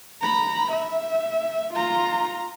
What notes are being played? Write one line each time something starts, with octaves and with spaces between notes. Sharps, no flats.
A#5 B5
E5
F4 A#5